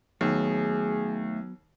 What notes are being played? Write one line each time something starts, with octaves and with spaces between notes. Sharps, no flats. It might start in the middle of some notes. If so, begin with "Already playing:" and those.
D#2 F#3 A3 B3 G#4